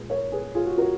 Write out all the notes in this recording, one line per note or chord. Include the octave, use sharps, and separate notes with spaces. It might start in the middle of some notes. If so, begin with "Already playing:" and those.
Already playing: A#2 G#3 G#4 B4
A#4 C#5
G#4 B4
F4 G#4
F#4
F#4 A#4